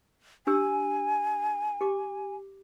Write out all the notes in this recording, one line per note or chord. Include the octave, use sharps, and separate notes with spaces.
D4 G4 G#5 E6
G4 D6